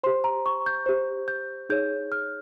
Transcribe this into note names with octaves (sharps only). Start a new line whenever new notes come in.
G4 C5 C6
A#5
C#6
G6
G4 C5
G6
D#4 G#4 C#5 G6
F6